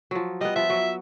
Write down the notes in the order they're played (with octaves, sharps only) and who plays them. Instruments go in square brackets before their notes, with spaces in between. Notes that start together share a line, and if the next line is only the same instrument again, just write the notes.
[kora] F3 F#3
[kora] G3 B3 [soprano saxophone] D#5
[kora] F3 [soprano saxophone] E5
[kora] F#3